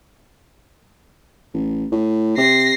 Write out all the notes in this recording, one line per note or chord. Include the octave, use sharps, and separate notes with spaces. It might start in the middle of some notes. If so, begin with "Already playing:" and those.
A1
A2
C3 A#6 C7